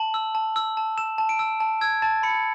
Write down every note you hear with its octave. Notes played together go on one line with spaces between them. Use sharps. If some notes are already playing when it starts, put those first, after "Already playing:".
Already playing: A5 F#7
E6
A5
E6
A5
E6 E7
A5
D7
E6
A5
E6 G#6
A5 A6
B5 C#7